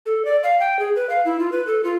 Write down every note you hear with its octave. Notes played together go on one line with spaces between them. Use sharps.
A4
D5
F5
G5
G#4
B4
F5
E4
F4
B4
A4
F4